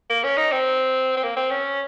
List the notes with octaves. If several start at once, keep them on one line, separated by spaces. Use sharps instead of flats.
A#3
C#4
D#4
C4
C4
A#3
C4
C#4